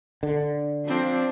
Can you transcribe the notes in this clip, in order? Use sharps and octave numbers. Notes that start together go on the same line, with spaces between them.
D3
F3 C4 D4